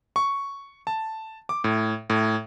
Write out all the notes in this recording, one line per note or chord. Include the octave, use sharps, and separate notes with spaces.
C#6
A5
D6
A2
A2